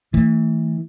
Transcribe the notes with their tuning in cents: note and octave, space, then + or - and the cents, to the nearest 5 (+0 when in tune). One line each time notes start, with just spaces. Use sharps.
E3 -25 A3 +25